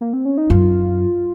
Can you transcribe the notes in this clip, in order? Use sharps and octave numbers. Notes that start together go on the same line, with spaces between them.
A#3
C4
C#4
D#4
F#2 F4